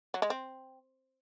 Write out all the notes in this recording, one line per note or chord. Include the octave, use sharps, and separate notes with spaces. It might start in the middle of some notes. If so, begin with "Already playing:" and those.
F#3
G#3
C4